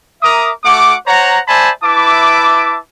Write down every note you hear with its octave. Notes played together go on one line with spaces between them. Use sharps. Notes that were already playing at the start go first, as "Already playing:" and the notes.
A#4 E5 A#5 D6 D#6
A3 F#4 F#5 D6
C5 C#5 F#5 A#5
C5 D5 E5 G#5 A5 B5
E4 B4 E5 A5 D6